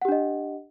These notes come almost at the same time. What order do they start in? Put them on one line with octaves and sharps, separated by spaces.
F#5 G4 D4 D#5